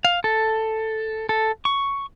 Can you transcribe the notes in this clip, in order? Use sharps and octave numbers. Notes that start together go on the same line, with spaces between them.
F5
A4
A4
C#6